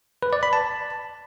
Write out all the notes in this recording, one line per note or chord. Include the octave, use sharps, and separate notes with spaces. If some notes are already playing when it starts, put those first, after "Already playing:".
B4
D5
B5
A5